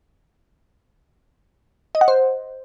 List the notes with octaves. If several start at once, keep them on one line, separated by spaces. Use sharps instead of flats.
D#5
F#5
C5